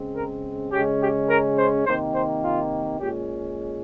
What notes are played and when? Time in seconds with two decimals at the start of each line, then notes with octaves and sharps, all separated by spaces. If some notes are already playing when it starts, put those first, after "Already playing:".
Already playing: C#3 G#3 C4
0.16 A#4
0.72 C#3 G#3 C#4 G4
1.01 G4
1.30 A#4
1.58 C5
1.86 C3 D#3 A#3 C5
2.15 C5
2.44 F4
3.00 A#2 G#3 C#4 G4